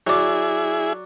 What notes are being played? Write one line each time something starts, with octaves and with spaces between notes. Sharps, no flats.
F#3 E4 G#4 D5